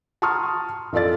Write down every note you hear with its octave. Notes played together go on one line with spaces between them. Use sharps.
A5 A#5 C6 C#6 D#6 F6
F2 F4 A4 D5 A6